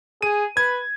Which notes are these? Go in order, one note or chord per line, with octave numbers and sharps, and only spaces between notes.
G#4 D#7
B4 G#6